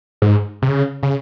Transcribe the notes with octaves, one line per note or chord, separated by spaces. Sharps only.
G#2
C3
C#3
C#3